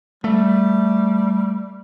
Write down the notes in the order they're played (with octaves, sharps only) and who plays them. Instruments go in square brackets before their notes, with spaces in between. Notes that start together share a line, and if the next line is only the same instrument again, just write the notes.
[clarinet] G3 [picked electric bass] A3